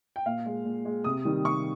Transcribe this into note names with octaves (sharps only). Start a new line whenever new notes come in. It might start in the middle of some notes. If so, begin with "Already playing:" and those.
G5
A#2 F5
G#3
A#2
G#3
C3 D#6
D#3 G3
C3 C#6